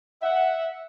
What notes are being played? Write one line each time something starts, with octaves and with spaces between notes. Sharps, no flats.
E5 F#5